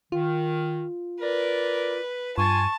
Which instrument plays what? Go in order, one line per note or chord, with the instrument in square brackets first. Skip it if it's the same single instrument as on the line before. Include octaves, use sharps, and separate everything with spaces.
[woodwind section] D#3 [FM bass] F4
[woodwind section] A#4 D5 [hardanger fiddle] B4
[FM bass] G2 [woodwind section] F4 G#5 [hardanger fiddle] A5 [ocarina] C#6